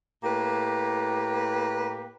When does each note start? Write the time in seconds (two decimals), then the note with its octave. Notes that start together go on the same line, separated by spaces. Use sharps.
0.23 A2 A#3 G4 B4